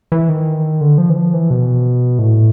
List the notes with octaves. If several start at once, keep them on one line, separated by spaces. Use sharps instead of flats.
E3
D#3
D3
F3
E3
F3
E3
B2
A2